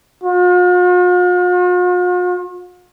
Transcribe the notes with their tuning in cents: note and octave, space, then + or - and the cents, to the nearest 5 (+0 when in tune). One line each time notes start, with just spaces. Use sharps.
F4 +45